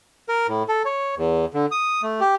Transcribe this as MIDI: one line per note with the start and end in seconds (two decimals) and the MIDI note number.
0.29 0.47 70
0.48 0.63 45
0.68 0.83 69
0.85 1.15 73
1.17 1.45 40
1.54 1.66 50
1.71 2.02 87
2.03 2.20 57
2.20 2.35 67